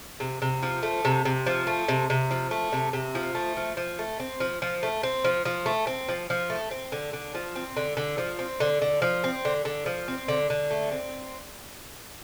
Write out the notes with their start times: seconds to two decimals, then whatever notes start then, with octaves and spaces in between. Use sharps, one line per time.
0.20 C3
0.42 C3
0.63 F3
0.83 A3
1.05 C3
1.25 C3
1.46 F3
1.67 A3
1.88 C3
2.10 C3
2.31 F3
2.51 A3
2.72 C3
2.93 C3
3.15 F3
3.35 A3
3.57 F3
3.77 F3
3.99 A3
4.20 C4
4.40 F3
4.62 F3
4.83 A3
5.03 C4
5.25 F3
5.45 F3
5.66 A3
5.87 C4
6.08 F3
6.30 F3
6.50 A3
6.71 C4
6.92 D3
7.13 D3
7.35 F3
7.56 C4
7.77 D3
7.97 D3
8.18 F3
8.39 C4
8.60 D3
8.82 D3
9.02 F3
9.24 C4
9.45 D3
9.65 D3
9.86 F3
10.08 C4
10.28 D3
10.50 D3
10.71 A3
10.92 C4